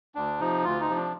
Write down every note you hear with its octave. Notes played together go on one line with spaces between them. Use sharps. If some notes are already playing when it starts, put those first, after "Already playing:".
D2 D4
C3 F3 D#4
D2 F4
D#4
C3 F3
D4